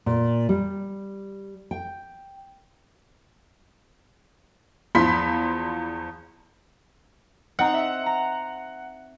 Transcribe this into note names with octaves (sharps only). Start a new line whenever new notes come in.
A#2
G3
G5
E2 F3 B5 C6 B6
C4 D#4 F#5 A#5
E5
A#5